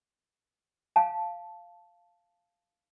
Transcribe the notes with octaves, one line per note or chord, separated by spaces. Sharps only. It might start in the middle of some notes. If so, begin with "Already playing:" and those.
F5 A5